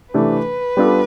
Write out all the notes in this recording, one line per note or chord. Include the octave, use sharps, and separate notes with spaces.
C3 E3 A3 D4 B4
G3 B3 D4 F4 A4